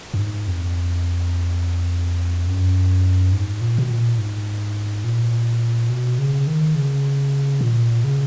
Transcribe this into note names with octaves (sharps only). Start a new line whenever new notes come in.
F#2
G#2
F2
F#2
G#2
A#2
B2
A#2
G#2
A#2
B2
C#3
D#3
C#3
A#2
C#3